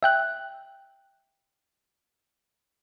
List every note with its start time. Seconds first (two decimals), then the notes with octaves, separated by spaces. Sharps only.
0.03 E5 G5 F#6